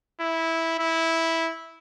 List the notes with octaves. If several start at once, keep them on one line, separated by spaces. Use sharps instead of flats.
E4
E4